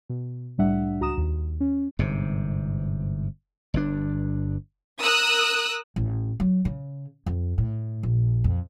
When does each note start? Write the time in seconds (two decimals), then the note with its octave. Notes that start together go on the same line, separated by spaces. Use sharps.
0.09 B2
0.58 C2 A2 G3 D4 E5 F#5
1.00 C#2 F#4 A#5 D#6 E7
1.18 D#2
1.60 C#4
1.99 G1 G#2 C3
3.74 G1 G2 D4
4.99 A#4 D#6 E6 F#6
5.96 A1
6.40 F#3
6.65 C#3
7.26 F2
7.58 A2
8.03 A#1
8.44 F2